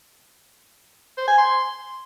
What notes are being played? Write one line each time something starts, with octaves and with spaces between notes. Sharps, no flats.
C5
G#5
C6